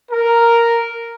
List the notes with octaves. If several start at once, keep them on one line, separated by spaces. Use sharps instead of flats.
A#4